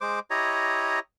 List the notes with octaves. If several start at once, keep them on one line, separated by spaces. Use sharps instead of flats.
G#3 C5 D6
E4 G4 C#5 D#5 A#5